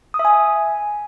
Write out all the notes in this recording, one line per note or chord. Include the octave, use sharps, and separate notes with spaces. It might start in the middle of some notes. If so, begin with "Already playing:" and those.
D#6
E5
G#5